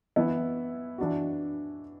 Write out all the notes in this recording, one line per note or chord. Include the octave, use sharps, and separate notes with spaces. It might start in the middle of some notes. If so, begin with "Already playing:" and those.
E3 B3 E4
E3 D4 F#4